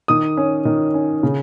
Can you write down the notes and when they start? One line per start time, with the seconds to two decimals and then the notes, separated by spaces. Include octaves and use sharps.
0.08 D#3 D#6
0.37 C#4
0.65 D#3
0.94 C#4
1.23 C#3